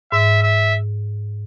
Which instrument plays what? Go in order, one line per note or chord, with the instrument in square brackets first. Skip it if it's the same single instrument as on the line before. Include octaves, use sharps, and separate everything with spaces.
[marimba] G#2 [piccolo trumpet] E5
[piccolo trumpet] E5